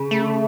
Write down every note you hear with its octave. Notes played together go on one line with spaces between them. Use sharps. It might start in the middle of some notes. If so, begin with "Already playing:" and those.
Already playing: C#3
A3